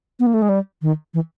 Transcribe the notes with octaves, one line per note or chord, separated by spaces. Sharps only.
B3
A#3
A3
G#3
G3
D#3
E3